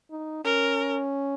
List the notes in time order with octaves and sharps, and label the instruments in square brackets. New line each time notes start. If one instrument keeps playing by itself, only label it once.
[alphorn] D#4
[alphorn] C#4 [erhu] A#4